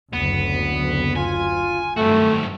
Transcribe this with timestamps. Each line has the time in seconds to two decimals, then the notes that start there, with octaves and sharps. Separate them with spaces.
0.13 F#1 D2 B3
1.16 F4 G#5
1.97 G2 D#3 F#3 A3 C4 F#4